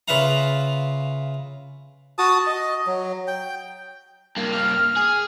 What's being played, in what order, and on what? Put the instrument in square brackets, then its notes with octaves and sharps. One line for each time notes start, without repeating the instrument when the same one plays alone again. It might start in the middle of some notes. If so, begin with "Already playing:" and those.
[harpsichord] C#3 F4 B4 E5 F5 A#5
[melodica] F#4 A5 D#6
D#5
F#3
G5
[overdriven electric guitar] G2 A#3
[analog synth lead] F6
[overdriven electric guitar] G#4